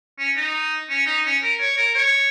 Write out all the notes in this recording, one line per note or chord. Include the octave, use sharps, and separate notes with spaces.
C#4
D#4
C#4
D#4
C#4
A#4
C#5
A#4
C#5